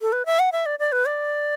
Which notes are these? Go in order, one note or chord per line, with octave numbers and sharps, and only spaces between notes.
A4
B4
E5
F#5
E5
D5
D5
B4
D5